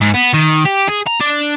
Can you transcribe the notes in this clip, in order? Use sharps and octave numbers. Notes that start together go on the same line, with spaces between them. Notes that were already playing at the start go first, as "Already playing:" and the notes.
G#2
B3
D#3
G4
G#4
A#5
D4